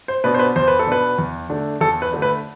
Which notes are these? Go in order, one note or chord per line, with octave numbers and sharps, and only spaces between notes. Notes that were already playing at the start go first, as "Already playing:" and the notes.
C5
B2 B3 D4 B4
C5
B4
E2 C5
B4
A4
B2 B3 D4 B4
E2
D3 A3 D4
E2 A4
B4
D3 A3 D4
B4